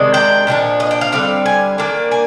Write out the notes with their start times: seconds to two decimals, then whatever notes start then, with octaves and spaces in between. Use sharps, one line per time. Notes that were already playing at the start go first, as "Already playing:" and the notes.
Already playing: C3 D#3 G#3 D4
0.14 G5
0.47 A#2 F3 A#3 D4
0.80 D#5
0.91 G5
1.01 F5
1.12 D3 G3 C4 F5
1.46 G#5
1.78 D#3 A#3 D4
2.11 G#5